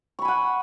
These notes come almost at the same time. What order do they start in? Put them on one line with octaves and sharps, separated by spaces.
C#6 B5 G#5 F#5